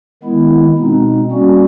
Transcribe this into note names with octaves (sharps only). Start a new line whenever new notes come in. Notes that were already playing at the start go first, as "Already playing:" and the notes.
D#3 G#3 B3 E4
B2 G#3 C4 D#4
G3 A#3 C#4 F#4